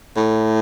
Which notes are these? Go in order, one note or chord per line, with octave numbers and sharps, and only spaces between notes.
A2